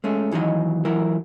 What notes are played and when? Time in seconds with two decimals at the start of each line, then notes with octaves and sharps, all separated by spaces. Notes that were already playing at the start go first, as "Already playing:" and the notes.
0.04 G#3 A3 C#4
0.31 D#2 E3 F#3 D#4 D#5
0.85 E3 F#3 E4 A#4